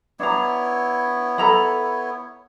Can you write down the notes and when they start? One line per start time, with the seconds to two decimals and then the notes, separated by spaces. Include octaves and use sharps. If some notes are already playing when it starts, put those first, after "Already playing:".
0.20 B3 D4 E4 C#5 A#5
1.38 A4 A#5 B5